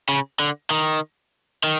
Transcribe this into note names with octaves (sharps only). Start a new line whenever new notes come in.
C#3
D3
D#3
D#3